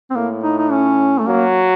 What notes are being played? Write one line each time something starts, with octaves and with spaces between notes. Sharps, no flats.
C4
A2 A#3
D#4
D#4
C#4
A3
F#3 A#3